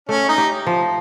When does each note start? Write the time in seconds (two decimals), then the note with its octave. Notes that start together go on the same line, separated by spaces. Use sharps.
0.09 A3 C#4
0.28 D#4
0.38 G4
0.67 F3